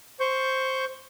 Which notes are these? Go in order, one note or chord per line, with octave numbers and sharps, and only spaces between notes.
C5 C#6 G6